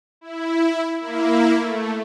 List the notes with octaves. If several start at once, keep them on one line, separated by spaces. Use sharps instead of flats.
E4
A#3 E4
A3